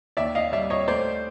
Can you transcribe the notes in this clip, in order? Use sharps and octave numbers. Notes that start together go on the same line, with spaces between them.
D#2 D5 E5
D#5 F5
G3 D5 E5
C#5 D#5
A3 C5 D5